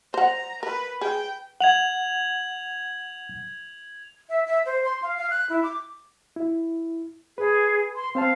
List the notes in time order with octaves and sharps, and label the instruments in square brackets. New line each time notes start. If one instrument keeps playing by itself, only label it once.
[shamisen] C5 F#5 [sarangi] A#5
[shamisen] A#4 [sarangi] B4
[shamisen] G#4 [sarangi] G5
[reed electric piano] F#5 [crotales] G#6 F7 F#7
[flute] E5
E5
C5
C6
F5
F5
F#6
E4
D6
[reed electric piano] E4
[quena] G#4 [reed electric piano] B4
[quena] C6
[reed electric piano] C4 C5 A5 [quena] F5